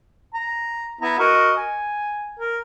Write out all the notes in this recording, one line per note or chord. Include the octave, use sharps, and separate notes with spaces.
A#5
B3 E4 A#5
F#4 A#4 D#5
G#5
A#4